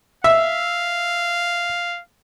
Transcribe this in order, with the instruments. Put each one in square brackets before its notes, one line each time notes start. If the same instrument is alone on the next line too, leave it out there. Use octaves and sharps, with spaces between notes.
[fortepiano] E5 [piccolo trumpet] F5